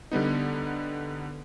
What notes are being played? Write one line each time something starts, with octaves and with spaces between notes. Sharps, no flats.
D3 G3 B3 D#4